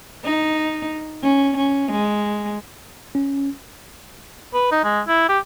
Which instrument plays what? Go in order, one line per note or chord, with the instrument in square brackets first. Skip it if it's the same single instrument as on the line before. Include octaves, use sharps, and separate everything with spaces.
[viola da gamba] D#4
C#4
C#4
G#3
[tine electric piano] C#4
[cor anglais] B4
D#4
G#3
E4
G4